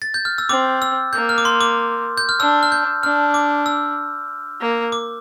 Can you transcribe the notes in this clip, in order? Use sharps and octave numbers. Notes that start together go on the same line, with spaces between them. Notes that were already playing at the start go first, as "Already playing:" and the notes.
A6
G6
F6
E6
C4 D6
E6
A#3 G6
F6
D6
C6
D6
G6
F6
D4 E6
F6
G6
D4 F6
D6
E6
A#3
D6